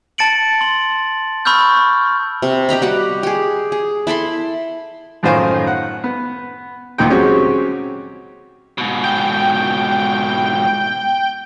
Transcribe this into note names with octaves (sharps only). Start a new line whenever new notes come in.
A5 A6 C#7 D7 F#7
C6 F#7
B5 C#6 E6 F6 G6
C3
G4 D#5 A#5 B5
G3 F#4 G4 F#5
G4 G#4
G#4
E4 A4 B5 C6
F#2 A2 D#3 F4 C5 G#5
F#5
B3
D2 A#2 D#3 D#4 G5
F#3 G#3 C4 C#4 F#4 G4
G#2 B2
G5